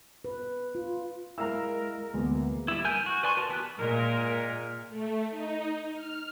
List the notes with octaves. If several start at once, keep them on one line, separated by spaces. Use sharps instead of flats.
B4
F4
G#3 E4 A#4 F5 A#5 E6 F6
D2 E3 G#3 A#3 B3
G3 E4
A#4 G#5 G6
F#4
B4 D5 G#5 C6 C#6
F#4 A#4 A5
E3 B3 G4 F#6
A#2 G#3 A#4
A3
D#4
F6